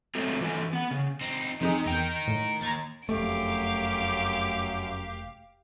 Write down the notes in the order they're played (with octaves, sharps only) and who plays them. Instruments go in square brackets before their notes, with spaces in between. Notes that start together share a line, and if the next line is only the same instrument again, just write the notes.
[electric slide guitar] F#3 G#3 A3 C4
E3 F#4 A4 G#5
B3 F#5
C#3
[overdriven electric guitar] C4 D#4
[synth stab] F2 D#4 G#4 [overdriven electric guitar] C3
[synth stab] E2 G5 [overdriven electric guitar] D#4 A#4
[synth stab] A2
[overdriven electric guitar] D#2 [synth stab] A#5 G#6 A6
[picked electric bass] F1 A3 [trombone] F#2 [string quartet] G4 F5 [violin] D7